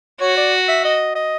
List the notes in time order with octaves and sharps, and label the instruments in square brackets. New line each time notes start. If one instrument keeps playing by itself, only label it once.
[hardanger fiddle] F#4 [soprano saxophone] C#5
[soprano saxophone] D5
E5
D#5
D#5